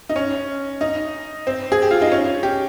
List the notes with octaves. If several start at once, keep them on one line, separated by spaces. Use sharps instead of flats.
D#4
C#4
D#4
C4
G#4
G4
F4
D#4
C#4
G4